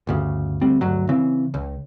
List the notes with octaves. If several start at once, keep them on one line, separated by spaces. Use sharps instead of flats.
G1 D2 C#3
D2 G3 C4
D2 G2 F#3
C#3 E3 C4
C#2